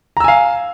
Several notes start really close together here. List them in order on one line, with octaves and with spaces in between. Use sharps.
A#5 E6 G#5 F5